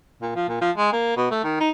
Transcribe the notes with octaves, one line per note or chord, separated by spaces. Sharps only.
A#2
F3
A#2
F3
G#3
A#3
B2
A3
D#3
D#4